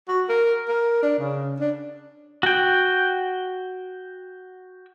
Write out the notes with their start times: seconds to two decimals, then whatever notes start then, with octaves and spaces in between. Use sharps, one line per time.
0.08 F#4
0.29 A#4
0.68 A#4
1.03 D4
1.18 C#3
1.60 D4
2.43 F#4 G5